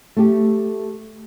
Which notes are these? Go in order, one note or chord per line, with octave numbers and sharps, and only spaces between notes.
A3 G4